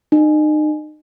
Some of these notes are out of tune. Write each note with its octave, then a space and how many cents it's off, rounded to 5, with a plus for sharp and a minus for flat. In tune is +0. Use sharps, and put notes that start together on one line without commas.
D#4 -35